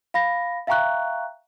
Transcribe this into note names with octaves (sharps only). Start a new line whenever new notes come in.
F5 B5 A#6
E5 F5 G5 A#5 C#6 F#6